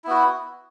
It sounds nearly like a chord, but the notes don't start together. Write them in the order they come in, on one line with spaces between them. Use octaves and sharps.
E4 B3 F#4